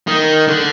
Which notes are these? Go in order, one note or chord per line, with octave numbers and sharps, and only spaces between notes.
D#3
D3